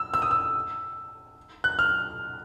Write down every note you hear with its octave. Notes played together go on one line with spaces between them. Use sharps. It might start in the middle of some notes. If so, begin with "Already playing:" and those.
Already playing: E6
E6
D#6
E6
F#6
F6